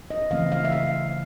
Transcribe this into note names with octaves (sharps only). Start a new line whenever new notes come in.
D#5
C#3 E3 A3 C4 F5
F5
E5
F5